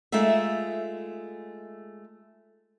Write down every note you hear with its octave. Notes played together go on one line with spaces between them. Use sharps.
G#3 A3 D#4 F4 E5